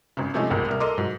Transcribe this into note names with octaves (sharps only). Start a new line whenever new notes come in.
G#1 C#3
C3 F3 G#3 A3 C#4 D#4
D#1 G#1 C#2 G#2 A#3
C2 A#4
A4 A#4 D#5 C6 D6
G#2 F#3